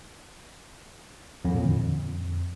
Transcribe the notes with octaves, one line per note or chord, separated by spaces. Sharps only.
F2
A#2
D3
F2